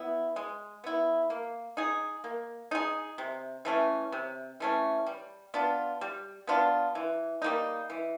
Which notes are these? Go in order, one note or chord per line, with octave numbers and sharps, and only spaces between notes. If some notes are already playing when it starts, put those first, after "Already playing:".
Already playing: B3 E4
G#3
B3 E4
A#3
D#4 G#4
A#3
D#4 G#4
C3
E3 A3 C#4
C3
E3 A3 C#4
G3
B3 D4 F4
G3
B3 D4 F4
E3
G3 A#3 D#4
E3